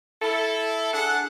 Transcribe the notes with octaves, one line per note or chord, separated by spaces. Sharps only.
E4 A4
D4 G#4 A4 F#5